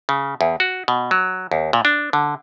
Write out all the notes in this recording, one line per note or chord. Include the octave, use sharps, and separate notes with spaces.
C#3
E2
F#4
B2
F#3
D#2
A#2
D4
D3